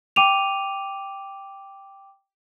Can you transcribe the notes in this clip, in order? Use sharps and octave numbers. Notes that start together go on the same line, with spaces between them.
G5 D6 D#7 F7